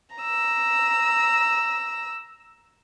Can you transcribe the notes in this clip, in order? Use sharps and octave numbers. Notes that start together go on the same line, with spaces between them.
A#5 E6